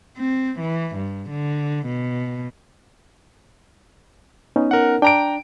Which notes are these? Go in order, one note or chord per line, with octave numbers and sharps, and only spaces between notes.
C4
E3
G2
D3
B2
B3 C#4 D#4
A#4 F#5
D4 G5 A#5 D7